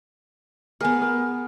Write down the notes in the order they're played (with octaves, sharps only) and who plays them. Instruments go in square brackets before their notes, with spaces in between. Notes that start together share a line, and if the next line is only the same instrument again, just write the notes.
[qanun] B3 G#4 [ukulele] A#4 G#5
[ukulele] A#4